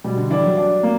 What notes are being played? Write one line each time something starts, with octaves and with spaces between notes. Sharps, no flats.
B2 G3
D3
E3 D4
F#3
D4
A#3